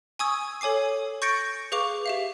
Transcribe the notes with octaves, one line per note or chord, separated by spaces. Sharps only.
G#5 C#6 D#6 E6 G#6
A4 C#5 G#5 D6 C7
C#6 G6 A6 A#6 C#7 D7
G#4 B4 F5 C#6 D6 F7
G4 E5 F5